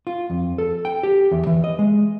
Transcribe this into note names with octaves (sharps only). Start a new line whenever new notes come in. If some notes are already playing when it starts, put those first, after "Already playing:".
F4
F2
A4
G5
G4
E2
E3
D#5
G#3